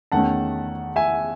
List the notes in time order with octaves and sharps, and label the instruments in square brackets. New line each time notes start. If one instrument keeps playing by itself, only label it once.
[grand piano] E2 D#3 A3 C#4 F#5 A5
E5 G#5